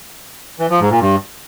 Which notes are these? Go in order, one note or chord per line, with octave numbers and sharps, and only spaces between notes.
E3
F3
G#2
A#2
G2